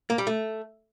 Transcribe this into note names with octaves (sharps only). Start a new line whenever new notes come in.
A#3
G3
A3